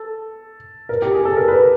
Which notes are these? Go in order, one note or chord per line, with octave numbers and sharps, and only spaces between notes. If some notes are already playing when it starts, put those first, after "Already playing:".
Already playing: A4
A#4
G4
G#4
A4
A#4
B4